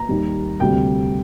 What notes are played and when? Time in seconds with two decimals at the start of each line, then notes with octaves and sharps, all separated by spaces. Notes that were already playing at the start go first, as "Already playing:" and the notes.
Already playing: A#5
0.09 D#2 D#3 G3
0.60 D2 C3 G3 G5